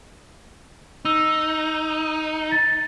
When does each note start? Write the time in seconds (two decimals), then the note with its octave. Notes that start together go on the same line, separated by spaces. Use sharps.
1.05 D#4 E6
2.52 A6